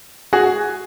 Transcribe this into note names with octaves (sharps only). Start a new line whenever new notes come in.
F#4 G#4